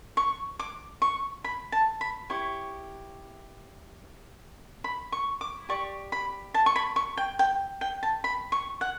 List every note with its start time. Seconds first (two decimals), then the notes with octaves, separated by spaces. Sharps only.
0.17 C#6
0.59 D6
1.02 C#6
1.44 B5
1.72 A5
2.01 B5
2.30 E4 G4 C#5 C#6
4.84 B5
5.12 C#6
5.41 D6
5.69 G4 D5 C#6
6.12 B5
6.54 A5
6.66 C#6
6.76 B5
6.96 C#6
7.17 G5
7.39 G5
7.81 G5
8.03 A5
8.24 B5
8.52 C#6
8.81 F#5